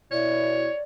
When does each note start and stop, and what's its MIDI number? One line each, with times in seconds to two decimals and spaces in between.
0.12 0.67 47
0.12 0.67 64
0.12 0.78 73
0.12 0.83 74